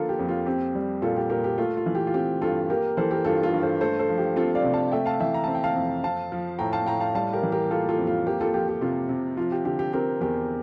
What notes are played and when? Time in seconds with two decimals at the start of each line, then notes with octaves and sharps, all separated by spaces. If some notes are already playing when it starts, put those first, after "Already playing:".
Already playing: D3 F3 A#3 F4 A4
0.09 G4
0.19 F2
0.28 F4
0.46 C4 G4
0.75 G3
1.02 A#2 F4 A4
1.16 G4
1.30 A#2 G4 A#4
1.44 G4
1.58 A3 F4
1.77 F4
1.86 E3
1.95 G4
2.07 F4
2.14 C4 G4
2.41 G2 F4 A4
2.70 A#3 G4 A#4
2.97 E3 A4 C5
3.11 G4 A#4
3.25 G2 F4 A4
3.43 F4 A4
3.53 G2
3.63 A4 C5
3.80 A3 A4 C5
3.99 A4 C5
4.09 F3
4.18 G4
4.36 C4 F4 A4
4.55 D5 F5
4.64 C3
4.73 F5 A5
4.92 A3 E5 G5
5.06 F5 A5
5.20 E3 E5 G5
5.34 A#5
5.44 C4 A5
5.55 G5
5.64 F5 A5
5.75 F2
6.03 C4 F5 A5
6.32 F3
6.59 A2 G5 A#5
6.72 F5 A5
6.86 A2 G5 A#5
7.00 F5 A5
7.15 G3 F5 A5
7.33 G4 A#4
7.43 E3
7.52 G4 A#4
7.71 A#3 F4 A4
7.89 F4 A4
7.98 F2
8.07 F4
8.27 A#3 G4
8.41 F4 A4
8.54 F3 G4
8.69 G4
8.81 C3 F4
9.09 C3
9.37 F3 F4
9.52 G4
9.65 D3 G4
9.79 G4
9.93 C4 G4 A#4
10.21 E2 G4 A#4